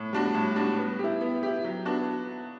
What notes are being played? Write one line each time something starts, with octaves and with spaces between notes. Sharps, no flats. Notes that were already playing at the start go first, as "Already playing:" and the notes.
Already playing: A2
G3 D4 F#4
A2
G3 D4 F#4
B3
E4 G4
B3
E4 G4
F#3
B3 D4 F#4